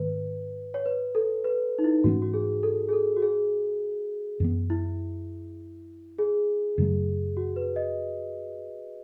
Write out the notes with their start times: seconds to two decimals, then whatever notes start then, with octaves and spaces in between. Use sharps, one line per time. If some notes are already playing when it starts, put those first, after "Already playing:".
Already playing: G#2 D#3 A3 B4
0.74 C#5
0.86 B4
1.15 A4
1.44 B4
1.78 D#4
1.84 E4
2.04 G#2 E3 A3 C#4 F#4
2.22 F#4
2.34 G#4
2.63 A4
2.89 G#4
2.93 A4
3.17 F#4
3.22 G#4
4.40 F#2 E3 B3
4.70 E4
6.19 G#4
6.78 F#2 C#3 F#3 A3
7.37 F#4
7.56 B4
7.76 D#5